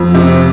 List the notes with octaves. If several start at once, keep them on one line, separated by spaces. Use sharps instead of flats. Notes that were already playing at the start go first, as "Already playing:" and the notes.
Already playing: F2
C3